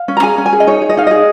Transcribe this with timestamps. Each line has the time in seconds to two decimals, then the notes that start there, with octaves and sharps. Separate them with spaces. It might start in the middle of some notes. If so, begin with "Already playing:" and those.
Already playing: F5
0.08 C#4
0.17 A#5
0.23 G#4 G#5
0.38 C#4
0.46 G#5
0.53 G#4
0.60 D#5
0.67 D#4 C#5
0.82 G#4
0.89 D#5
0.97 D#4 F5
1.07 G#4 D#5